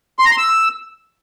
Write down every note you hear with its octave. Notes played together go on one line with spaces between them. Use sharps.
C6
A#5
C6
E6